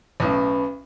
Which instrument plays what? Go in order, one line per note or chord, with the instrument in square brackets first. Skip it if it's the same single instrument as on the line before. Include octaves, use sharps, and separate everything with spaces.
[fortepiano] B1 A2 [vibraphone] C#4 B4 B5